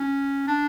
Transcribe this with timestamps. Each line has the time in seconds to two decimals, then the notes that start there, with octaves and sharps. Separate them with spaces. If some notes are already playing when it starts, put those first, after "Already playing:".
Already playing: C#4
0.47 D4